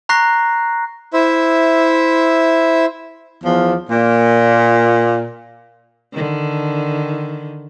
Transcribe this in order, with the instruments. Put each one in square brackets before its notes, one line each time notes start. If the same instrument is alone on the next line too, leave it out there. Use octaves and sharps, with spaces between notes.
[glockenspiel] A#5 C#6 F#6 A#6 C7
[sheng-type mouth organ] E4 C5 E5
[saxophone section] E2 F3
A#2
[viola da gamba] D3 D#3